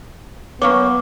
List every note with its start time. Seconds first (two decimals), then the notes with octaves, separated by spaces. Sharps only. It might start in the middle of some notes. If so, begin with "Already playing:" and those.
0.62 F#2 A#3 B3 C#5 D6